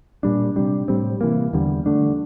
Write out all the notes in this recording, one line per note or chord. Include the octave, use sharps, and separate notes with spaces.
A#2 G3 D4
C3 G3 D4
A2 G3 C4
C3 E3 A#3
E2 D3 G3
D3 A3 D4